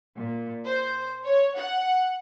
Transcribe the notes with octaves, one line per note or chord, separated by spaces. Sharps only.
A#2
C5
C#5
F#5